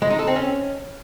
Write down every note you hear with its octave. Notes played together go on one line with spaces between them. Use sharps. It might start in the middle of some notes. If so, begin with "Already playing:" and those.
G#3
D#4
A4
C4
C#4